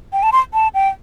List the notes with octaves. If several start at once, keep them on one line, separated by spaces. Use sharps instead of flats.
G5
A5
C6
A5
G5